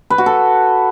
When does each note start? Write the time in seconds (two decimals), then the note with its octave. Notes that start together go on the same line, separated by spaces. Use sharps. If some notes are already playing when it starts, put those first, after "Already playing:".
0.10 B4
0.18 F#4
0.26 A4